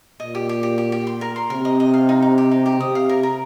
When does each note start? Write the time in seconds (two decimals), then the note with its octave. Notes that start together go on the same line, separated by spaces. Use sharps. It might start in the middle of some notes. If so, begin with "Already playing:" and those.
0.20 A#2 D#5
0.35 G4
0.49 G4
0.63 G4
0.78 G4
0.92 G4
1.07 C6
1.21 A#4
1.36 C6
1.50 C3 A#4
1.65 D#5
1.80 D#5
1.94 F5
2.09 D#4
2.22 D#4
2.38 G4
2.51 D#4
2.66 G4
2.80 C3 D#6
2.95 F5
3.09 A#4
3.23 A#4